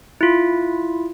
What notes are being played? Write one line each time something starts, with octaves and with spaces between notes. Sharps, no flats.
E4 F4